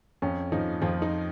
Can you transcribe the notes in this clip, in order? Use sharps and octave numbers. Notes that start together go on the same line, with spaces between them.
F2 C#4
F3 D#4
F2 F3 F4
D#4